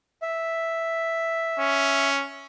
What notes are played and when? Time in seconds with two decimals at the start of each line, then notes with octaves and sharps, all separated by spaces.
0.22 E5
1.60 C#4